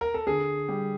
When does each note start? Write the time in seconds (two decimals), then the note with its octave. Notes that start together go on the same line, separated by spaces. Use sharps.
0.01 A#4
0.14 A4
0.27 D3 G#4
0.68 G3 G4